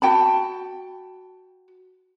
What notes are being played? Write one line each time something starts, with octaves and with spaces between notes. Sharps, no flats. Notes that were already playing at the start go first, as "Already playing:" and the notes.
F#4 G5 A5 B5